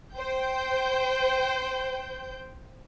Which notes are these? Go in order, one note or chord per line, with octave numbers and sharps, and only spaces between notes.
C5 G5 G6